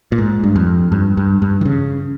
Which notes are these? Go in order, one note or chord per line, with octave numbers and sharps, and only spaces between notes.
A#2
G#2
G2
F2
G2
G2
G2
E3
C#3